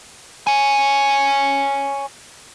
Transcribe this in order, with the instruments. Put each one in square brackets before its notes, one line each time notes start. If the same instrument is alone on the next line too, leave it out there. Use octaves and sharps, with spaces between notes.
[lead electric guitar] C#5 G#5